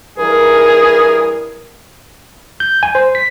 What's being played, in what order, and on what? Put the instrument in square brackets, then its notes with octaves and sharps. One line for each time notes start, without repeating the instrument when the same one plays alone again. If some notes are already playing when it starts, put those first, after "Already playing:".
[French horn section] G2 E3 A#4 [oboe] G#4
[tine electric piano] G6
G#5
C5
B6